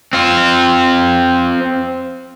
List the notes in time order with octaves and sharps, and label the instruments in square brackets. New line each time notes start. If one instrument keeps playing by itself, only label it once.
[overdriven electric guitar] C4 F4